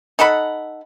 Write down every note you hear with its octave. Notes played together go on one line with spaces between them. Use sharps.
D#4 A4 F#5 B5